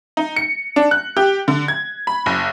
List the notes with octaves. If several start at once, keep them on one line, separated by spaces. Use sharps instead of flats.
D#4
C#7
D4
F#6
G4
D3
G#6
B5
F#1